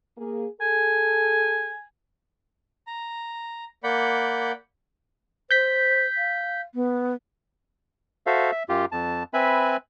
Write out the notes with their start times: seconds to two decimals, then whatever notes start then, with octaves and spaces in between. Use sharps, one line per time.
0.18 A#3 G#4
0.61 G#4 A4 G#5
2.87 A#5
3.84 A#3 D5 F#5 B5 G6
5.51 C5 G6 B6
6.17 F5
6.74 B3
8.27 F#4 A4 C5 E5 F5
8.52 E5
8.69 F#2 F4 G4
8.92 F2 A5
9.34 C4 B4 E5 G#5 B5